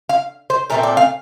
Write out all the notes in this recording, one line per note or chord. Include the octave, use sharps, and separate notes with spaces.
F5
C5
A#2 A3 C4 A#4
D5
F5